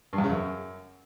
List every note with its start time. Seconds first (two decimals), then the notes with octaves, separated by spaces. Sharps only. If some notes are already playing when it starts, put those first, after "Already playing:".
0.13 G2
0.18 E2
0.24 C#3
0.29 F#2